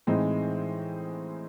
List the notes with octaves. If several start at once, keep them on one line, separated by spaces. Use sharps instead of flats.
A2 E3 G#3 C4 D#4